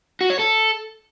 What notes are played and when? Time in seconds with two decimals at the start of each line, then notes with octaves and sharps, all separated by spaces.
0.21 F#4
0.30 C#5
0.39 A4